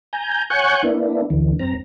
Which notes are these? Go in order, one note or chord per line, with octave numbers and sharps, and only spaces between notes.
G#5 A#5 G6
C#5 F#5 G#5 C#6 F#6 G6
A#3 B3 D4 E4
D2 D3 E3
F#2 C4 A#5